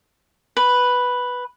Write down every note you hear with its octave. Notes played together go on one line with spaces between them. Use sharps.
B4